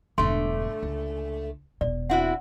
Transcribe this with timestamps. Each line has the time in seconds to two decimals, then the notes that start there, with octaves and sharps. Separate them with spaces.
0.18 E1 G2 D3 A3 C6
0.83 C#2
1.81 E1 B2 D5
2.10 C4 E4 F#4 F#5